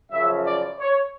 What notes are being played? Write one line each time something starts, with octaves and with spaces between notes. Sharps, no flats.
F#2 C#3 F3 E5
D5
C#5